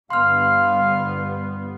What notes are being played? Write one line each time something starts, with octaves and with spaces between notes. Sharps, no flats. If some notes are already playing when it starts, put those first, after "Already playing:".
G1 G3 B3 F5 C6 F6